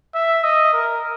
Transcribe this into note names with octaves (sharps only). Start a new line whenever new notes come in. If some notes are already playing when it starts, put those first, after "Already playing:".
E5
D#5
A#4